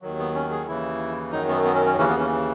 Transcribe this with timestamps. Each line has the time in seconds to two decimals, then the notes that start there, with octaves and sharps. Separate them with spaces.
0.02 D#2 D#3 F#3
0.19 B3
0.35 C#4
0.51 G#4
0.67 D#2 C#3 E3 E4
1.32 F#2 D#3 F#3 D#4
1.49 B3
1.65 B3
1.75 C#4
1.86 C#4
1.97 D#2 C#3 E3 C#4
2.08 B3
2.18 C#4